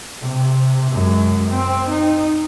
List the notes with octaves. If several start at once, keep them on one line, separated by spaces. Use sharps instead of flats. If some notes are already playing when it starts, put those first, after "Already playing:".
C3
F#2 G#3
C4
D#4